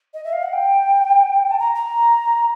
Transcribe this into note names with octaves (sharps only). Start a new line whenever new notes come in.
D#5
E5
F5
F#5
G5
A5
A#5
A#5